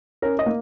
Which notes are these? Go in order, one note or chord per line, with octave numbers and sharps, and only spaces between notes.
C#4 A#4
D#5
A#3